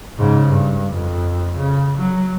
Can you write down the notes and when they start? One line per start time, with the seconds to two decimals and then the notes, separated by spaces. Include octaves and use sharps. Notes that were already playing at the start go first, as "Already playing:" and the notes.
0.18 G#2 C#3
0.47 G2
0.92 F2
1.57 C#3
1.98 F#3